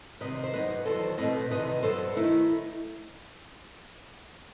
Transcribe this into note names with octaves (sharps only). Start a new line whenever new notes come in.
C3 D#3 G3 C4 B4 D#5
C5
G2 F#3 B3 D#4 B4 D#5
E2 D#3 F#3 A4 C5
B2 A3 C4 B4 D#5
E2 C3 D#3 G3 C4 B4 D#5
G2 F#3 B3 A4 C5
D#3 A3 D#4 E4